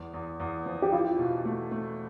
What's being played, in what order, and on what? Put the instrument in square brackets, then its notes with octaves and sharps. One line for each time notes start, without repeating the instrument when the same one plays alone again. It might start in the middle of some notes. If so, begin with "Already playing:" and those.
Already playing: [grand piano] E2
E2
E2
F3
[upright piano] G4
[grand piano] E4 [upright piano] F4
[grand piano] B2
A3
A3